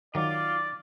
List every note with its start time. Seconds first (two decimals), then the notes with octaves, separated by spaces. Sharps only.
0.15 D#3 F#3 F4 D5 D6